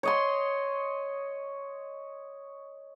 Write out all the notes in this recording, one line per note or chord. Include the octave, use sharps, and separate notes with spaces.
C#5 D#5 C6